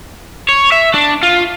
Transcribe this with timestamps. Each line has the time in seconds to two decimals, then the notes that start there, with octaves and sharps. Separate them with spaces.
0.49 C#5
0.72 E5
0.94 D4
1.23 F4